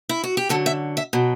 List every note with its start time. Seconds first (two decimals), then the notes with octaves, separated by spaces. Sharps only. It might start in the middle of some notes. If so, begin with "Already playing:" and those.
0.09 E4
0.24 F#4
0.37 G4
0.49 F#2 D3 F#3 A4
0.66 E5
0.97 E5
1.13 B2 F#3